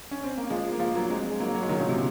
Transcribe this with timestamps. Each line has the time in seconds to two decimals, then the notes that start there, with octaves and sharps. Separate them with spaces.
0.11 C#4
0.24 C4
0.37 A#3
0.50 F3 G#3
0.72 A#3
0.80 F3 G#3
0.95 F#3 A#3
1.09 G#3 C4
1.30 G#3
1.40 F#3 A#3
1.55 F#3 A#3
1.63 G#3
1.69 D#3 F#3
1.79 A#2 C#3
1.89 C3 D#3